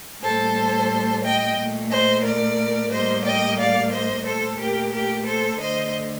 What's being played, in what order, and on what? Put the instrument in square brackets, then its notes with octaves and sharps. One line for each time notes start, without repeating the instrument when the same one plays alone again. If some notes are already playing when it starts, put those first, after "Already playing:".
[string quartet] A2 G3 A#3 A4 C5
D#5 G5
A#2 A3
C5 D#5
A#4 D5
A2 G3 A#3 C5 D#5
D#5 G5
D5 F5
C5 D#5
A#2 A3 A4 C5
G4 A#4
G4 A#4
A4 C5
D3 A3 C5 D#5